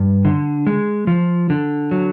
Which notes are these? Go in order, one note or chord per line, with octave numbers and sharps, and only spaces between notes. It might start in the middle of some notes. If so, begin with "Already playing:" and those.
Already playing: G2
D3
G#3
F3
D3
F#3